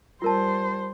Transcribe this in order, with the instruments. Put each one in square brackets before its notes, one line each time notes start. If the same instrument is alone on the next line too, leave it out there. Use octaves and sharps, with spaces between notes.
[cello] G3 C5 [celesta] F4 A#4 A5